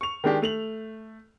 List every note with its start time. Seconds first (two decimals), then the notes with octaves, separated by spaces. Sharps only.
0.01 C#6 F7
0.24 D#3 G#3 D4 G4
0.42 A3 F7 F#7